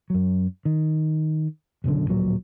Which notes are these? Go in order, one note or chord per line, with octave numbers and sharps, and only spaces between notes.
F#2 F#3
D#3
F#1 B1 F#2 D3
D1 A#1 A#2 F#3